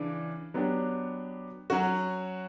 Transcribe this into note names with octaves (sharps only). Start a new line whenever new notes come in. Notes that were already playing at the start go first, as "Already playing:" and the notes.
Already playing: C#3 E3 D4
F#3 B3 D4 G4
F#3 C#4 F#4